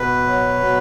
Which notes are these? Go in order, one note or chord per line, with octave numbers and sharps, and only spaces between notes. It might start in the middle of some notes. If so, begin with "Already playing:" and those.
Already playing: B2 B4
F#3
B2